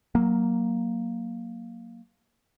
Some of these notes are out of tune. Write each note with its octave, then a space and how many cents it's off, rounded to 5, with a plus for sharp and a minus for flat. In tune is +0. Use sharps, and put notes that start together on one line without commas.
F#3 +0 A#3 +0